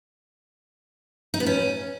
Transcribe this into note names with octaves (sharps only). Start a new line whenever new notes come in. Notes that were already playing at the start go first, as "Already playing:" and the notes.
D#4
B3
C#4